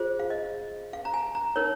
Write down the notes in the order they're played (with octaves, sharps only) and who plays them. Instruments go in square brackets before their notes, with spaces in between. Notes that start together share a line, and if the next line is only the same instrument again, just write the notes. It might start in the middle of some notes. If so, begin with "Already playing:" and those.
Already playing: [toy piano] F4 G#4 C5
F5
D#5
F5
A#5
G#5
A#5
D#4 A#4 C#5